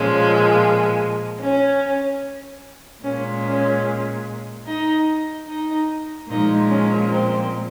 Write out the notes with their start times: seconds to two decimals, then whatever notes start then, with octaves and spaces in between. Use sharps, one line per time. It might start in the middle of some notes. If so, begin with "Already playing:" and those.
Already playing: A#2 F3 G#3 C#4
1.40 C#4
3.03 A#2 G#3 C#4
3.44 C#4
4.66 D#4
5.48 D#4
6.29 A#2 F3 G#3 D#4
6.70 C#4
7.11 C4